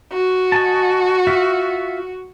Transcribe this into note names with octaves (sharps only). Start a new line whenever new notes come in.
F#4
D#5 G#5 A5
F4 E5